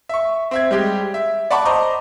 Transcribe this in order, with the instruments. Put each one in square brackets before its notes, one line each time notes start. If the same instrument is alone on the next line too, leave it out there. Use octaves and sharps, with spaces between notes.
[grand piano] E5 C#6
C4 E5 G#6
G3 G#3 G4
E5
D5 F#5 A5 B5 C#6 D6
C5 D#5 A#5 D6